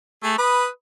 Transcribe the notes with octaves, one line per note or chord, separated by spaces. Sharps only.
A3 G#4
B4 B5 D#6